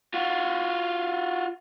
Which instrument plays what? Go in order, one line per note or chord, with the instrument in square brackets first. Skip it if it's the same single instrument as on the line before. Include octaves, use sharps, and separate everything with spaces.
[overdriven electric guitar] F4 F#4